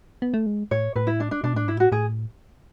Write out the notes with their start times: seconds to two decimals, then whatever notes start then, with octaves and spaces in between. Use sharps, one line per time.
0.22 B3
0.34 A3
0.46 G#3
0.71 A2 C#5
0.96 A2 B4
1.07 E4
1.20 D4
1.31 D4
1.44 B2 D4
1.54 A2 D4
1.65 G#2 E4
1.75 A2
1.80 F#4
1.92 A2 G#4